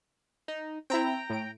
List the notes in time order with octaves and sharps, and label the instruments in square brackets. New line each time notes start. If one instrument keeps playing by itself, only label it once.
[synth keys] D#4
[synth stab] C4 E4 [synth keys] G5 A#5
[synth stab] A2 D7